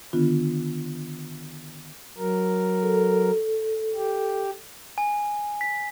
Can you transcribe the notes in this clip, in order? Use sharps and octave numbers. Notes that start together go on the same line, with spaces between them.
D3 D#3 B3 D4 F4
F#3 A#4
A4
G4
G#5
B6